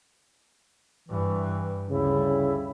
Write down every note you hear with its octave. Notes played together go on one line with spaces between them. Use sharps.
G2 E3
D2 C#3 G3 E4